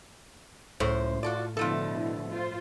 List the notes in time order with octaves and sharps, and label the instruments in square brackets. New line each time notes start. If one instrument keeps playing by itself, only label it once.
[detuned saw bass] C#2 [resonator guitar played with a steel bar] F#2 C5 [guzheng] A2
[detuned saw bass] F4 [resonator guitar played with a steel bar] F#4 A4 D5
[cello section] B2 D3 [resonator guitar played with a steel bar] F3 A3 A4 [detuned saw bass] E4
[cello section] F4 C5